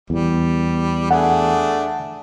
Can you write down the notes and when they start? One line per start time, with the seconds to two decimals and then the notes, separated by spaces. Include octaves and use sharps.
0.10 E2 G3
1.11 A3 D4 G#4 F#5